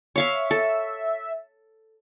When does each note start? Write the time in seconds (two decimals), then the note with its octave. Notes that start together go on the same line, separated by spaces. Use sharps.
0.16 C#5 E5 F5 C#6
0.51 A4